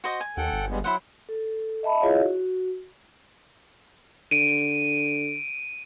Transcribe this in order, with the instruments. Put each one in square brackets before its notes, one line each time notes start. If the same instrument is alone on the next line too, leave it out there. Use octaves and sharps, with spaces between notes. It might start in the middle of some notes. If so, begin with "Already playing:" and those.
[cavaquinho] F#4 C5 D#5
G#5
[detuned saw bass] D#2 [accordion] A4 F#5 G5
[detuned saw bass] G1
[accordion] G3 G#3 B3
[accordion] F#3 [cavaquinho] E4 C5 F#5
[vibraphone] A4
D#5 E5 A5 B5
E4 F4 G#4 C#5 D#5 F5
F#4
[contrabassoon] D3 [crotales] D7 D#7